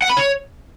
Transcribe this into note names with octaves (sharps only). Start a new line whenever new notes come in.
F#5
B5
C#5